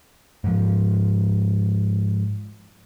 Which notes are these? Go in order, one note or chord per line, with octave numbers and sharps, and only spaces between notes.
G#2 F3